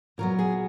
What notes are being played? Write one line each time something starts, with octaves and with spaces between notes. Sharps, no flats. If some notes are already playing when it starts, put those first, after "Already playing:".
A#2 F#3 B3 A#4
G#4